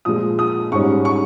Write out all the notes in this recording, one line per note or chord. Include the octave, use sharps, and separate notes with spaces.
A#2 F3 G#3 D#6
D#6
G#2 G3 C#4 C#6
C#6